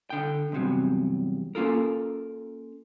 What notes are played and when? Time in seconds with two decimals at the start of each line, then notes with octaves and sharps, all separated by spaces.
0.10 D3 G5
0.52 E2 G2 C3 F#3
1.55 A#3 C#4 F4 A4 A#4